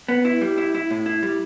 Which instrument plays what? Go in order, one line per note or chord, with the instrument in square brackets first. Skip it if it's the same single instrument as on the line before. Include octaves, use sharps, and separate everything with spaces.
[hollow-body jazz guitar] B3
E4
G3
E4
E4
A2
E4
G3